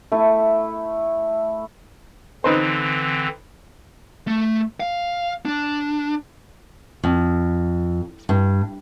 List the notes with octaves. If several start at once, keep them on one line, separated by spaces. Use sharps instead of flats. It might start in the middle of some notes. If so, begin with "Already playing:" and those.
A3 E4
D3 E3 C4 D#4 B4 C5
A3
F5
D4
F2
G2